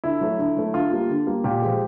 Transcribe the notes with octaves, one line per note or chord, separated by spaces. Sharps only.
D3 E4
F#3 A3
D3
F#3 A3
D3 F4
G3 A#3
D3
G3 A#3
A#2 G4
F3 G#3